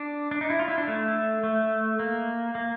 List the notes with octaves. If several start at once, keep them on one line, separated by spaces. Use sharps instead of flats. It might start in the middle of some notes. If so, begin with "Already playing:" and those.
Already playing: D4
D4
D#4
E4
F4
E4
D4
A3
A3
A#3
A#3